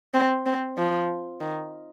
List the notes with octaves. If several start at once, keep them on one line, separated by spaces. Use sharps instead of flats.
C4
C4
F3
D#3